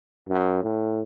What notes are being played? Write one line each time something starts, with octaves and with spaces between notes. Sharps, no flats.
F#2
A2